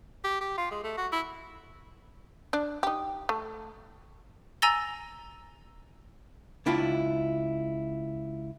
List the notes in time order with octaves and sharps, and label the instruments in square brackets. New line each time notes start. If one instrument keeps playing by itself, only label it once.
[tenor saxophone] G4
G4
F4
G#3
A3
F#4
E4
[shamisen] D4
D#4 G4
A3
[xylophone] G#5 A#5 E6 A6 A#6 G7
[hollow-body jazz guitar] C#2 D4 E4 F4 G5